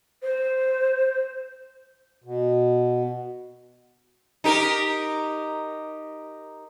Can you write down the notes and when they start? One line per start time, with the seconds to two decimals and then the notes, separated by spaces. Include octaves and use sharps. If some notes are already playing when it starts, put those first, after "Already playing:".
0.22 C5
2.24 B2
4.44 D#4 G4 A#4